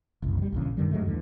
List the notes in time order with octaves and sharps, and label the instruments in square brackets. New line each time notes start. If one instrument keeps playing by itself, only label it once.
[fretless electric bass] F#1 C2
D#3 G3
A#1 E2 C#3
G2 D3 D#3 G3
G2 F#3 G#3 A3
D#2 D3 E3